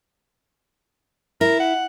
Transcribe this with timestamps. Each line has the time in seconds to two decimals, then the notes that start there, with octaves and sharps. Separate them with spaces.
1.41 E4 A#4
1.60 F#5